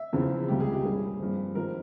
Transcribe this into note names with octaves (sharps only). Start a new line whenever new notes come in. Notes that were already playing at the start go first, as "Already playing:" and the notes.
Already playing: E5
E2 C#3 F3 C4
C#2 C3 G3 G4
G#4
G4
G2 G3 A#3 C#4 G#4
G2 F3 C4
G#2 F3 C4 A#4